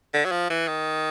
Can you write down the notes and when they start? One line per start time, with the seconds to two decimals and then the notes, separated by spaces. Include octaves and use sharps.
0.14 D3
0.25 F#3
0.31 F3
0.50 E3
0.68 D#3